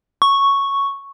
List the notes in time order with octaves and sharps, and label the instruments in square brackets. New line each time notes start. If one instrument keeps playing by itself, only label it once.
[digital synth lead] C#6